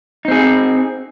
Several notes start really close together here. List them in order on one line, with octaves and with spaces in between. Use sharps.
D#4 C4 G#4